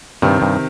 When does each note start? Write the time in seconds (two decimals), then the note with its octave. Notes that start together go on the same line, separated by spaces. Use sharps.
0.22 G2 C3 D#3
0.42 G2